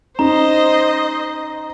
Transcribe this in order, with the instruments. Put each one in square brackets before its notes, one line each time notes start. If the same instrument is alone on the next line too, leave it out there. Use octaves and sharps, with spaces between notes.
[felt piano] C#4 D#4 [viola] C5 D#5 [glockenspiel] A#5